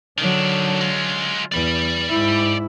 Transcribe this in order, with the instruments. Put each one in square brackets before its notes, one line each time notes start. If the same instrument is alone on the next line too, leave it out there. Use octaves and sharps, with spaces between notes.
[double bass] D3 F#3 [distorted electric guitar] D#3 D4
[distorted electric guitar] G#3 F4
[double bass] E2 [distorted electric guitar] D5 B5
[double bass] G#2 E4